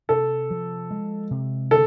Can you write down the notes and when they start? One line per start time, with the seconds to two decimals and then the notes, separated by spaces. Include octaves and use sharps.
0.09 C3 A4
0.51 F3
0.91 G#3
1.31 C3
1.71 D3 A4